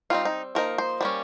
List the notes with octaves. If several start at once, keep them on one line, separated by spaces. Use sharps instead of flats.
G3 C4 D#4 F4
D#4
F3 A#3 D#4 A#4
C5
G3 A#3 C#4